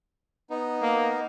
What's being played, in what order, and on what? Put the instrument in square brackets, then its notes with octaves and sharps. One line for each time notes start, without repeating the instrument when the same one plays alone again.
[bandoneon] B3 D#4
[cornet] A#3